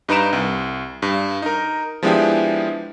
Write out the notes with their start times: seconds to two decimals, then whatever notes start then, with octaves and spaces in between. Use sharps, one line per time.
0.09 G2 D#4 B4 A#5 D7 E7
0.33 C2
1.02 G2
1.42 D#4 A#4
2.03 F3 G#3 B3 D4 E4 G4